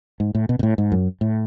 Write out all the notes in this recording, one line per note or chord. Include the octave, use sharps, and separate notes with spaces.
G#2
A2
B2
B2
A2
G#2
F#2
A2